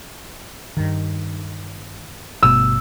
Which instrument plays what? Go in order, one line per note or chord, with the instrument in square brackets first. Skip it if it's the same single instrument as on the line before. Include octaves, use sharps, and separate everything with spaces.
[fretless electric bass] G2 D#3
[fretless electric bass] G1 B2 A3 [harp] E6